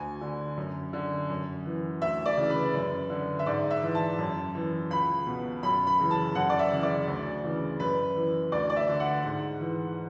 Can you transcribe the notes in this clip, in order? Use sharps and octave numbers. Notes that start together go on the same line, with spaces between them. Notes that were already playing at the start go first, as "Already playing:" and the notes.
Already playing: D2 G#5
D3
F#2
D3
F#2
E3
D2 E5
D5
C#3 E3
B4
F#2
D3
E5
G#2 D5
E5
E3
A5
F#2
E3
C#2 B5
B2
F#2 B5
B5
C#3 E3
A5
F#2 F#5
D5
E5
C#3 E3
D5
D2
C#3 E3
F#2 B4
E3
D2 D5
D5
E5
D3
F#5
G#2
E3